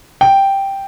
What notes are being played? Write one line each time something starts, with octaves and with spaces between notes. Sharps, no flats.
G5